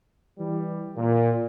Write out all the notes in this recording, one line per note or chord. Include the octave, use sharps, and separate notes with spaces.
E3 G3
A#2